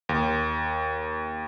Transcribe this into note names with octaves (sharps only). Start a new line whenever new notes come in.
D#2